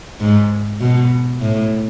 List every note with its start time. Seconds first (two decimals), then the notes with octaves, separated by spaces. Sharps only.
0.20 G#2
0.80 B2
1.40 A2